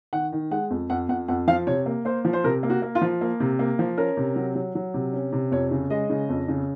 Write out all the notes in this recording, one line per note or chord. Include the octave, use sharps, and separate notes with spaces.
D#3 F#5
D#3
G#3 F#5
F2
F2 F#5
F2 F#5
F2 F#5
F3 F5
C3 C#5
A#3
A#3 C5
F3
C5
C3 A#4
A#3
F#4
A#3
F4
F3
A#3
C3
A#3
F3
C#4 A#4
C3
F#3
F#3
F#3
C3
C#4
C3
F2 C#5
C#3
G#3 D#5
C#3
F2
C#3